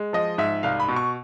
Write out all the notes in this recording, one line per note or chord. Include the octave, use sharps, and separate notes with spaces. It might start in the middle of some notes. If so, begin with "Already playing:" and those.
Already playing: G#3
F3 D#5
G#2 E5
C2 F5
B5
B2
C#6